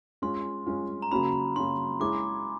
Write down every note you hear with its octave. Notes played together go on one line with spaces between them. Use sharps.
G#3 C#4 F4 C6
G#3 C#4 F4
A#5
C#3 F#3 A#3 C#4 F#4 B5
C#3 F#3 A#3 C#4 F#4 C6
G#3 C#4 E4 G#4 D6